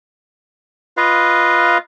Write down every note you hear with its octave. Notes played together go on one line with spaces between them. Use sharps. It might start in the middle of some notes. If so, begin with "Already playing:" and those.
F4 B4 D#5 F5